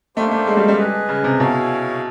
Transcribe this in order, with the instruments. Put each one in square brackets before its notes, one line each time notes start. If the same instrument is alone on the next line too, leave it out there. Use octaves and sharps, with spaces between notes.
[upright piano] A3 [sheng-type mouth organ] A#3 D4 G4 C5
[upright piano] A3
G#3
G3
G3
[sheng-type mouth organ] G#4 B4 D#5
[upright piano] C#3
C3
[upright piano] B2 [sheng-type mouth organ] E4 G#4 C#5 F5 G#5